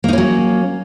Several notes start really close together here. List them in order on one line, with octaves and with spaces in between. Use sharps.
A#3 D#4 C#4 F#3